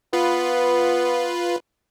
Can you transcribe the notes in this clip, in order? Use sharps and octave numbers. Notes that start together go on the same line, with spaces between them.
B3 F4 B4